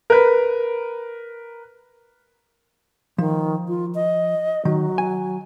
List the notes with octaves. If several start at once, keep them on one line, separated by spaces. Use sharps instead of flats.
A#4 B4
D#3 F3
F4
D#5
D#3 F#3
G#5